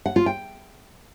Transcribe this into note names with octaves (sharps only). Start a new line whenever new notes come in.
F#5
F4
G5